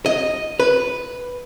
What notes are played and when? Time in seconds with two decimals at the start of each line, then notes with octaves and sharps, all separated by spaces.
0.06 D#5
0.60 B4